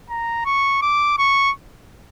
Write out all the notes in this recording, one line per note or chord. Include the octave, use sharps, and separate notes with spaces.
A#5
C#6
D6
C#6